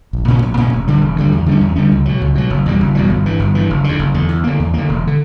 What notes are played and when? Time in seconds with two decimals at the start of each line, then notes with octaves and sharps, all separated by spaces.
0.13 A#1
0.28 A#2 A#3 C#4
0.42 A#1
0.57 A#2 A#3 C#4
0.73 E1
0.88 D2 D3 G3
1.01 E1
1.16 D2 D3 G3
1.32 E2
1.46 D3 G3 C#4
1.61 E2
1.76 D3 G3 C#4
1.91 C#2
2.05 B2 F#3
2.21 C#2
2.35 B2 F#3
2.50 F#1
2.66 E2 B2 G3
2.80 F#1
2.95 E2 B2 G3
3.10 G1
3.25 G2 E3
3.40 G1
3.55 G2 E3
3.70 F#1
3.84 E2 D3
3.99 F#1
4.14 E2 D3
4.29 E2
4.44 D3 A#3
4.59 E2
4.74 D3 A#3
4.89 E1
5.07 D3